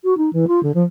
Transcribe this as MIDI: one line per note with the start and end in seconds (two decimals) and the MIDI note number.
0.04 0.17 66
0.17 0.30 63
0.33 0.45 52
0.47 0.62 65
0.63 0.72 50
0.74 0.83 53